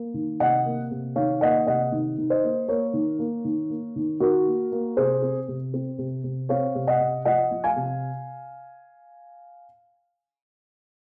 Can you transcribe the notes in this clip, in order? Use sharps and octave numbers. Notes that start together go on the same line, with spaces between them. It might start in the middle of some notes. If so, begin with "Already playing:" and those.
Already playing: A#3
D#3
C3 D#5 F#5
A#3
C3
D#3 C#5 F5
A#3 D#5 F#5
C3 D#5 F#5
D#3
D#3
C5 D#5
A#3
A#3 A#4 C#5
D#3
A#3
D#3
A#3
D#3
D#3 F#4 A#4
A#3
A#3
C3 G#4 C5
C4
C3
C4
C3
C3
C4 C#5 F5
C3
D#5 F#5
C3
F3 D#5 F#5
F3
F5 G#5
C3